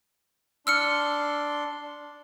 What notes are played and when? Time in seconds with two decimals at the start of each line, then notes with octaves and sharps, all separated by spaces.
0.67 D4 C6 E6 F6 C#7